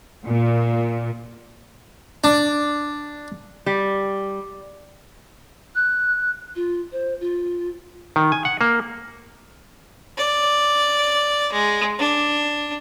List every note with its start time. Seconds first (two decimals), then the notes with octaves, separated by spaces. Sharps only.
0.23 A#2
2.24 D4
3.66 G3
5.75 F#6
6.56 F4
6.92 C5
7.21 F4
8.16 D#3
8.32 G#5
8.45 F#5
8.61 A#3
10.17 D5
11.52 G#3
11.99 D4